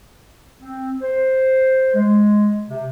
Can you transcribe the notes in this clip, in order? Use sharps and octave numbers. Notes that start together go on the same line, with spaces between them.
C4
C5
G#3
C3